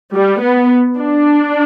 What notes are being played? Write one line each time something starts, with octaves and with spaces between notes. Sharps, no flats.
G3
B3
D4